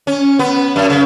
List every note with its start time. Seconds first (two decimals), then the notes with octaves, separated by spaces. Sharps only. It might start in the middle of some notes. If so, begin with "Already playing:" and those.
0.07 C#4
0.39 B3
0.76 F#2
0.90 C#3